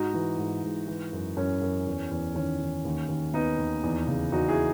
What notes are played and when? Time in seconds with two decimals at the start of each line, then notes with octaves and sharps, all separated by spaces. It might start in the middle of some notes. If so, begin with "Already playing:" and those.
Already playing: G#2 D#4 F#4
0.14 E3
0.38 G#2
0.63 G#2
0.88 E3
1.13 F#2
1.37 F#2 C#4
1.61 F#2
1.87 E2
2.11 E2
2.35 D#3 C#4
2.60 D#3
2.85 D#2
3.09 D#2
3.33 D#2 B3 D#4
3.58 D#2
3.84 E2
4.07 C#3
4.32 E2 D#4 F#4
4.48 E4 G#4